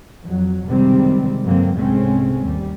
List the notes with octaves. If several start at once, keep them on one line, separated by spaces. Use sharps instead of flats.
F2 F#3
F#1 C3 D#3 G3 G#3 C4
G2 D3 F#3 G#3 A#3 C4
C2 G#2 G#3 A3 C4 C#4
D#2 G3